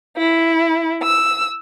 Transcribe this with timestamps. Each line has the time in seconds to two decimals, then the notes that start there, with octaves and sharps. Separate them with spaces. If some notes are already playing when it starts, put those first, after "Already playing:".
0.18 E4
1.02 E6